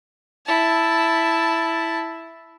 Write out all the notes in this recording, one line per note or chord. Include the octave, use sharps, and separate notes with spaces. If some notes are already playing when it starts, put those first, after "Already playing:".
E4 A5